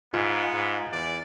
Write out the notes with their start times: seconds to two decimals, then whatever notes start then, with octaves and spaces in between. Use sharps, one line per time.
0.14 G#2 B3 F4 F5
0.54 G#2
0.92 E2 D5